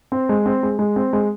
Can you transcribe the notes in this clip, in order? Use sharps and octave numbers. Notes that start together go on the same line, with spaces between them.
C4
G#3
C4
G#3
G#3
C4
G#3